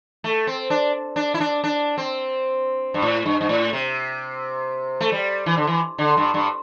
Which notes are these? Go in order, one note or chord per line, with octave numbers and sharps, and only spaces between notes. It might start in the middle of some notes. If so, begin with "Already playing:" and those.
A3
C4
D4
D4
E4
D4
D4
C4
G2
A2
G2
G2
A2
C3
A3
G3
E3
D3
E3
D3
G2
G2